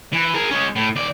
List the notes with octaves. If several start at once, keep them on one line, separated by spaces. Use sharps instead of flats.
E3
G#4 A#4
G#3 C#4
A2
D#2 D5